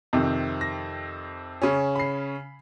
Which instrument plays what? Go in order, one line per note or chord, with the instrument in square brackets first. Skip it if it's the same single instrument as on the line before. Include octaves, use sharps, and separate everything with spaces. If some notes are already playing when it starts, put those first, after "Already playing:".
[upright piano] F2 C3 D#3
[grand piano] A#6
C#3 C#4
[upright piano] B5 C7